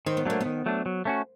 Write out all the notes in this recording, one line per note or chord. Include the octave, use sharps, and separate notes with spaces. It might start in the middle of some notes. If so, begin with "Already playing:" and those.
D#3 C4
B3
F#3 A3 A#3 D4
B3
D#3
F#3 A3 D4
F#3
A3 C#4 F#4